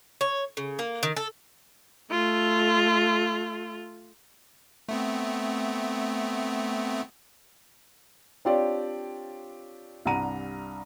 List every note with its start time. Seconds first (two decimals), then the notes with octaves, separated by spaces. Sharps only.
0.21 C#5
0.57 C#3
0.79 A#3
1.03 D#3
1.17 A4
2.11 A3 F4
4.89 A3 B3 C4
8.45 C4 D4 F4 G4 C#5 D5
10.05 C2 G2 F#5 A#5 D#7